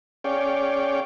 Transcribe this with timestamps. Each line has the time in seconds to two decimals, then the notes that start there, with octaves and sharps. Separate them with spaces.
0.24 C#4 G#4 C#5 D5 F5 G5